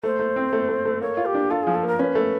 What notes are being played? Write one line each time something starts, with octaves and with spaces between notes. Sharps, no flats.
A3 C5
A3
C4
A3
A3
A3
A#3 C#5
F4
G4
D4
F4 A4
F3 G#4
A4
A#3 A#4
C#4 B4
A3